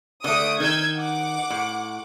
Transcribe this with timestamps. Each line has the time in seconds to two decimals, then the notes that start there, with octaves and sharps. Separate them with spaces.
0.24 D3 A3 D#6 D7
0.60 D#3 D#4 E6 G6 G#6
0.95 F#5 D6
1.50 A2